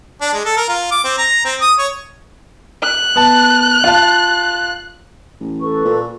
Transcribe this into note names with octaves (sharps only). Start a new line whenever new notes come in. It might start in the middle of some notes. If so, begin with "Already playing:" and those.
D4
G#3
A4
A#4
F4
D6
C4
A#5
C4
D#6
C#5
F#6
B3 A5
F4 F5 A5
A1
A4 B4 C#6
A#2